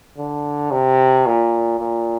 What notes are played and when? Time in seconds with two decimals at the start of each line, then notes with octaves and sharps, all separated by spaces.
0.17 D3
0.71 C3
1.26 A#2
1.80 A#2